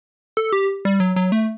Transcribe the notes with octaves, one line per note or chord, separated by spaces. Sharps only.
A4
G4
G3
F#3
F#3
A3